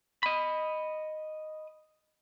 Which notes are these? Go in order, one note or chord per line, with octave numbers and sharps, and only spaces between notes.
D#5 B5